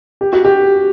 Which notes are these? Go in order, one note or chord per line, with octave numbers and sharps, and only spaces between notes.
G4
F#4
G4